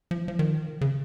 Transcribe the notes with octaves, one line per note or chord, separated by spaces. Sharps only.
F3
F3
D#3
C#3